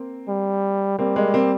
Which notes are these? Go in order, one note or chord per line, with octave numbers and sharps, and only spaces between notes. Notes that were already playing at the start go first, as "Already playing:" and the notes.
Already playing: A#3 C4
G3
G3 A#3 C4
G#3 A#3
A#3 C4